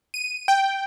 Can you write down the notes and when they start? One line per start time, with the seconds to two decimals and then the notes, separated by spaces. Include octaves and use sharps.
0.14 D#7
0.48 G5